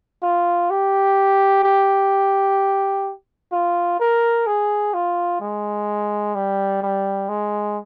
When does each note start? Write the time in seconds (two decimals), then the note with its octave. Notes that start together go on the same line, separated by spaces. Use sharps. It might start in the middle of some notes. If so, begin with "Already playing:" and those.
0.23 F4
0.70 G4
1.63 G4
3.52 F4
4.00 A#4
4.46 G#4
4.94 F4
5.40 G#3
6.35 G3
6.82 G3
7.29 G#3